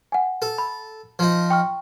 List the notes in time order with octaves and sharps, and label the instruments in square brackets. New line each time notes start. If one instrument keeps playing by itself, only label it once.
[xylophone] F#5 G#5
[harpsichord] A4
[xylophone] B5
[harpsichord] F3 D#4
[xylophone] G5 C#6 F6